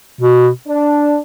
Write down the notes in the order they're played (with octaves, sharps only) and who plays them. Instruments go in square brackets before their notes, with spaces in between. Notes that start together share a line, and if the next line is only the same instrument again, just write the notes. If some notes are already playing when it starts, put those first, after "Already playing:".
[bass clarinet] B2
[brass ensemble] D4